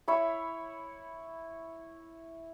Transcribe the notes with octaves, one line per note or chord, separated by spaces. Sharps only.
E4 C#5 B5